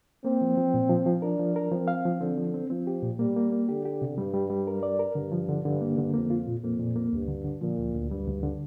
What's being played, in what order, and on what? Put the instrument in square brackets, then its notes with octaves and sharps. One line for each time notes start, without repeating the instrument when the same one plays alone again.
[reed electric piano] A#3 [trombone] C4
[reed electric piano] F3
F3
A#2
F3
F3
[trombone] D4 [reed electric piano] A#4
[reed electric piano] F3
A#4
[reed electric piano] F3 [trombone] C4
[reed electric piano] F5
F3
[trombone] D3 [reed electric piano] C4
[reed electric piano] F3
C4
[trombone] F3 [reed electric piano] C4
[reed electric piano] G4
A#2
[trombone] G3 [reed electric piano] A#3
[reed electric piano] A#3
A#3
[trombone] D3 [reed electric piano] G4
[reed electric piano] G4
C3
[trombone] G2 [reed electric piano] G3
[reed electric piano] G3
G3
A#4
D5
A#4
[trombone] G2 [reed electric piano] D3
[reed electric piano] F3
D3
[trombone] G2 [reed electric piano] D3
[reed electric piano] A#3
D3
[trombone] F2 [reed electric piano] A#3
[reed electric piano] F4
A#2
[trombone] F2 [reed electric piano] A#3
[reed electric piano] A#2
A#3
[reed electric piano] D2 [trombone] G2
[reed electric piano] D3
D3
[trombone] A#2 [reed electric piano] F3
[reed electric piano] D2
D2
[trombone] G2 [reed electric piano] G3
[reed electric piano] D2
D3